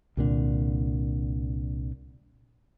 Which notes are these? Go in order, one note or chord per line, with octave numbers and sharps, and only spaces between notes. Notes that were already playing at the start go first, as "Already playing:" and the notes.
C2 A#2 D3